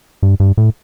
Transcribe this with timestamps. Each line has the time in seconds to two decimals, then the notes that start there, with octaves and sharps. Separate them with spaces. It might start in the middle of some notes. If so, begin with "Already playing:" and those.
0.23 G2
0.40 G2
0.57 A2